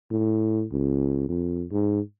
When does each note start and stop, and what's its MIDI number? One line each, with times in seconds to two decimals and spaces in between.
0.11 0.65 45
0.72 1.27 37
1.29 1.65 41
1.71 2.00 44